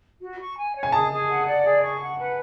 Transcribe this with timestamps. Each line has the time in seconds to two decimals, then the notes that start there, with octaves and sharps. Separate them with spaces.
0.21 F#4
0.39 C#6
0.57 G#5
0.75 C#5
0.83 G#5
0.92 G#4 A5
1.11 G#4
1.29 F#5
1.46 D5
1.65 G#4
1.82 C#6
2.01 F#5
2.18 B4